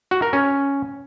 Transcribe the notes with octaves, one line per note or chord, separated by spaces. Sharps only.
F#4
A#4
C#4